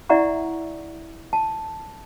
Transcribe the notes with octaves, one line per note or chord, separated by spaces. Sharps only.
E4 D5 E5 F#5 A#5 C#6
A5